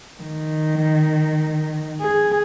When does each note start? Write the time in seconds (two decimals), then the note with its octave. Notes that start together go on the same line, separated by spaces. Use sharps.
0.21 D#3
2.00 G#4